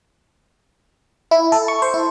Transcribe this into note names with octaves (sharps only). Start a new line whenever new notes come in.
E4
A4
C#6
C5
E4